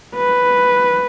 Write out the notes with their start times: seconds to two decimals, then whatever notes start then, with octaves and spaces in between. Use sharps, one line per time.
0.16 B4